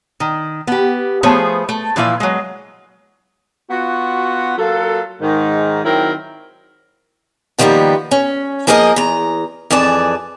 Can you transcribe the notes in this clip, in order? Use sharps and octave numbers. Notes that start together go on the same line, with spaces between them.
D#3
B3 G4
F3 A3 B3 G#4 C5 C#5
A3
A#2 E3 F3 E4 F4 F5
F#3 G#3
B3 F4 F#4
F#3 A#3 F4 A4
G#2 D#3
D#3 F#3 C4 E4 A#4
D3 D#3 F3 G3 A#3 B3
C#4
F3 A#3 G#4 A#4 C#5 D#5
E2 A#5
F2 E3 G#4 D5 A5